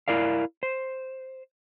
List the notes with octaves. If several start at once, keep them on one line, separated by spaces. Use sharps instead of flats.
E4 A#4 D5 F5
C5